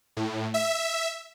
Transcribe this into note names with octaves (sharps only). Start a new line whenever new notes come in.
A2
E5